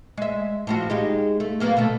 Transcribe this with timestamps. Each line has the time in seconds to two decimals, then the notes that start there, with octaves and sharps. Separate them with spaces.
0.17 G#3 E5
0.67 A2 F3 F#4
0.90 G#3 D#4 G4
1.40 A3
1.60 F#3 A#3 B3
1.77 B2 D3 A3